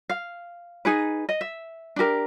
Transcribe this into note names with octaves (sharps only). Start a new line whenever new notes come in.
F5
D#4 G#4 B4
D#5
E5
D4 G4 A#4